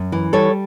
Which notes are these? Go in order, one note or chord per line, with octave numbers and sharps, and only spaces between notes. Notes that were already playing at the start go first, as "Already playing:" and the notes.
Already playing: F#2
E3
G3 A4 C#5